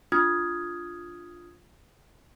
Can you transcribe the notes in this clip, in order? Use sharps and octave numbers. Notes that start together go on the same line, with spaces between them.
D4 F4 D#6 F6 G#6